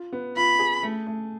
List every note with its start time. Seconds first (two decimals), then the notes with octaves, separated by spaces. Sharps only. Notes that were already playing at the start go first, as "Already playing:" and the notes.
Already playing: F4
0.13 B3
0.36 F4 B5
0.59 G#4
0.83 A3
1.07 A3